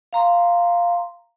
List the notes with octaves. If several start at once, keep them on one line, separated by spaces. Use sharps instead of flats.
F5 A#5 C6